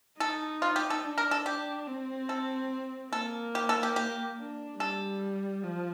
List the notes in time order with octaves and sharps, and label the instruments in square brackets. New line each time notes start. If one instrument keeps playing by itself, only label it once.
[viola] D#4 [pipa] A4
[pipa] F4
G4
A4
[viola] D4
[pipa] A#4
A4
G4
[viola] C4
[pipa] A4
[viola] A#3 [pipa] A4
[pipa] G4
A4
G4
G4
[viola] D4
[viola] G3 [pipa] A4
[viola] F3